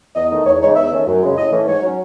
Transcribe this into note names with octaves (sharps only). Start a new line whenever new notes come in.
E2 D#5
D#3 A3 D#4
E2 C#5
C#3 G#3 D#4 C#5
E2 E5
D#3 A3 C#4
F#2
C#3 G#3
A2 D#5
E3 A3 C#4
G#2 C#5
F#3 C#4